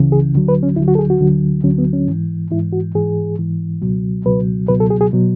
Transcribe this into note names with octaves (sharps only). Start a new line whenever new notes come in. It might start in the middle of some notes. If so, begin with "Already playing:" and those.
Already playing: C#2 C#3 E3
G#4
D2 D3 F#3
B4
C#4
D2 D3 F#3 E4
F#4
A4
G#4
F#4
D2 D3 F#3
D2 D3 F#3 C#4
B3
C#4
G#2 E3
G#2 E3 E4
F#4
G#2 E3 G#4
G#2 E3
C#2 B2 F#3
C#2 B2 F#3 B4
C#2 B2 F#3 B4
A4
G#4
G#4
B2 F#3